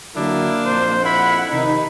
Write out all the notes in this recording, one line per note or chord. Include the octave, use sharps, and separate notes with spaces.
D3 F#3 A#3 D4 E4
A#1 F2 C5
E4 F#5 B5
C3 D#3 D#4 B5